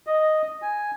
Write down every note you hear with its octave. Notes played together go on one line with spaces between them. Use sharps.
D#5
G#5